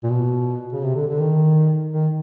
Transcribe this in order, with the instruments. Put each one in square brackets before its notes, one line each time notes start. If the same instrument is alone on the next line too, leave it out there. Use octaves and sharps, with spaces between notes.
[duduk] A#2
B2
C#3
C3
D3
D3
D#3
D#3